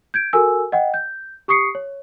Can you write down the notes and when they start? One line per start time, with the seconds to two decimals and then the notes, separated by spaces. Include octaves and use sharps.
0.14 G6 G#6 D7
0.33 F#4 A4 A#4 G#5 E6
0.72 D#5 F#5 G5
0.94 G6
1.48 G4 C#6 D#6 C7 C#7
1.75 C#5